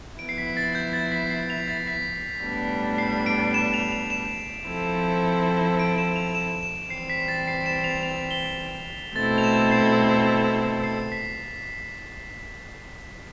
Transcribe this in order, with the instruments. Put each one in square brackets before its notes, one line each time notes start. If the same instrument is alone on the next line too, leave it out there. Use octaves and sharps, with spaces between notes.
[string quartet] E4 [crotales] D7
[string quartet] F3 B3
[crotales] C7
B6
A6
G6
A6
B6
C7
F7
A6
B6
[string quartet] A2 G3 B3 D4
[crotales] C7
D7
E7
F7
F7
E7
[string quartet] F3 C4 E4 A4
[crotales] D7
E7
F7
E7
E7
[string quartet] E3 G3 C4 [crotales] C7
[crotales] B6
A6
C7
E7
F7
F7
G7
[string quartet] B2 A3 C4 E4 A4 [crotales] A6
[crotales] F7
E7
C7
C7
B6